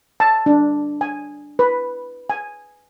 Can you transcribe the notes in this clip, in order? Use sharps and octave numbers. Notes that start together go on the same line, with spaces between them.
A5
D4
G#5
B4
G#5